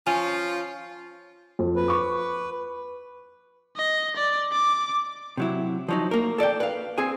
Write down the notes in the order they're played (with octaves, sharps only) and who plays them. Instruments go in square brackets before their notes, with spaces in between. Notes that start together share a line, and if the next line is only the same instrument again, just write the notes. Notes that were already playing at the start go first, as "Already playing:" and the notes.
[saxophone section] F3 F4 [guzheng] C#4 [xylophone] G#5
[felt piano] F2
[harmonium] B4
[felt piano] C#6 D6
[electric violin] D#5
D5
D6
[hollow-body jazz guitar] C3 F#3 E4
F3 F#3 D#4
A#3 A#4
A4 D5 F#5 G5
B4 F5
C4 G#4 G#5